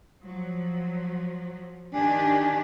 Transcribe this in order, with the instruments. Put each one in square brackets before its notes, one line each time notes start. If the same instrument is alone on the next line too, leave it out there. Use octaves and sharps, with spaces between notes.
[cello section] F3 F#3
[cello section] D#3 D4 G4 [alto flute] G#5